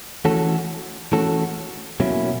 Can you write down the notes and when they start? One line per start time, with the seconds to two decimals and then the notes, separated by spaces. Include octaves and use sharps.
0.25 E3 A3 C#4 F#4 A4
1.12 E3 A3 C#4 F#4 A4
2.00 B2 F#3 A#3 C#4 E4